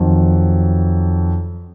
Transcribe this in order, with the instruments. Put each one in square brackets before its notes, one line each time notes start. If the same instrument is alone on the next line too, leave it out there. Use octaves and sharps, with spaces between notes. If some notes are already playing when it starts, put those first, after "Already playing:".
Already playing: [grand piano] F2 D#3 F#3